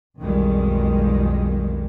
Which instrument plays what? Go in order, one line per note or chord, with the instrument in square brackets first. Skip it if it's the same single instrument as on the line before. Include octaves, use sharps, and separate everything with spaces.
[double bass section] B1 F2 D#3 G3 G#3